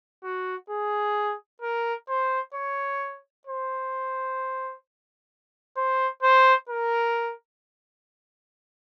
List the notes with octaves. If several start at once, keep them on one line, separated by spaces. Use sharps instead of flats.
F#4
G#4
A#4
C5
C#5
C5
C5
C5
A#4